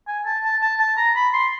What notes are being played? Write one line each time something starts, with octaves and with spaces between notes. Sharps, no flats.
G#5
A5
A5
A5
A5
A#5
B5
C6